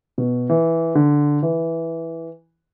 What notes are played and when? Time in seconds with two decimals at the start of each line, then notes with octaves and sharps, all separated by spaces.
0.18 B2
0.50 E3
0.95 D3
1.43 E3